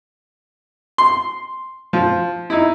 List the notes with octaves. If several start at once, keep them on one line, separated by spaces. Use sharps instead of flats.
C6
F3
D#4 E4